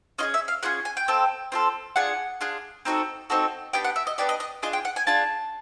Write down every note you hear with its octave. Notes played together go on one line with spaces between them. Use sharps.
C#4 F4 G#4 D#5
E5
F5
C#4 F4 G#4 F#5
G#5
G5
C4 F4 A4
C4 F4 A4
D4 F4 G#4 F#5
D4 F4 G#4
C4 D#4 F#4 A4
C4 D#4 F#4 A4
B3 D4 G4 G5
F#5
E5
D#5
B3 D4 G4 D5
D#5
D#5
D4 F4 G#4 D#5
G5
F#5
G#5
D4 F4 G#4 A5